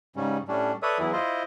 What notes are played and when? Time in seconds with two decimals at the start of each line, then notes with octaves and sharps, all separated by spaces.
0.16 G#2 C#3 G3 C#4
0.48 A2 G3 C#4 D4
0.83 A4 B4 C#5 D5 E5 D#6
0.99 E2 E3 F#3 E4 G#4
1.13 E4 F4 C5 D#5